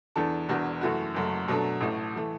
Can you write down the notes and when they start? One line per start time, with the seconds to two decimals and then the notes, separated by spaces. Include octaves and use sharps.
0.16 E2 E3 D4 A4
0.48 E1 E2 E3 D4 F#4
0.81 F#2 E3 A3 F#4
1.14 F#1 F#2 F#3 A3
1.48 B2 F#3 A3 D4 A4
1.81 A1 A2 A3
2.16 E3 A3